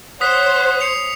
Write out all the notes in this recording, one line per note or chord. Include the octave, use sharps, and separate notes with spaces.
C5 C#5 F#5 D#6 B6
C7 C#7 F7